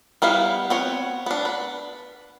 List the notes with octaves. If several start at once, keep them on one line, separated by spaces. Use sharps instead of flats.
G3 B3 E4 F5
B3 C4 C#5
B3 D4
B4